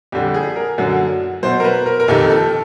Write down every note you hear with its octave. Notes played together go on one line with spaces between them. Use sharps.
F2 D3 G3 G4
G#4
A#4
F#2 D3 F#3
B2 F#3 C5
A#4
B4
A#4
A#4
F2 C3 D#3 A4
A4